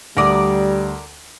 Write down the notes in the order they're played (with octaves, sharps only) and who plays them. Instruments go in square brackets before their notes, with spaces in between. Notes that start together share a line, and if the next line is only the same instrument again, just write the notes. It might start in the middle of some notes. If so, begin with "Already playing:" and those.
[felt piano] D2 [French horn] G3 [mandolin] A#4 D5 D#6